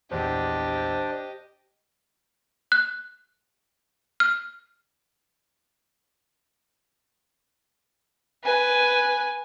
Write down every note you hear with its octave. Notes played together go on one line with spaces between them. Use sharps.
A#1 E2 D4 G4 C5 D#5
F#6
F6
B4 G#5